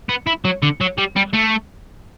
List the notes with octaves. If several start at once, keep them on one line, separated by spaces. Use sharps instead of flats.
B3
E4
F#3
D3
F#3
G3
G3
A3